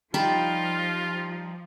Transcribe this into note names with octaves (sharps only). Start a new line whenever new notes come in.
F3 G3 D#4 F4 G5 A5 B5